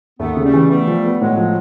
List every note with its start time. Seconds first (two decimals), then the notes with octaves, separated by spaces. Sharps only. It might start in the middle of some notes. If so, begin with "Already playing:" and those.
0.19 D#2 A3 B3
0.37 C#3
0.45 G3 A3
0.54 E3
0.70 G3 A3 B3
0.87 F3
1.04 B3
1.21 A2 F#3 G#3
1.37 F3